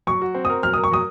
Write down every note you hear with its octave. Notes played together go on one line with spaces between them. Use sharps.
F#3 C#6
F#4
C4
D#6
A#4
F#3 F6
A#4 D#6
C#6
F#3 D#6